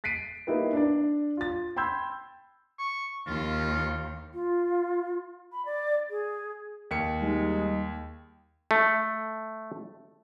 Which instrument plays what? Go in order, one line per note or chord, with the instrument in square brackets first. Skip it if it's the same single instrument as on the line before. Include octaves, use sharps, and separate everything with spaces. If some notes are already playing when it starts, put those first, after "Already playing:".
[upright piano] A6 B6 C7 D7 D#7
A#3 B3 D#4 E4 G4 B4
D4 D5
F4 A6
G5 B5 C6 E6 G6 G#6
[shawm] C#6
[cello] D#2 [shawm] F4
[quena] F4
B5
D5
G#4
[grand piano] D#2 C#7
[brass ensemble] G3 G#3 D#4
[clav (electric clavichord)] A3